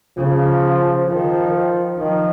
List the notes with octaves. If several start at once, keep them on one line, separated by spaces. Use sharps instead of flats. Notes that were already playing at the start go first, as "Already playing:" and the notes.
C#3 F3
D#3 F3
D#3 F3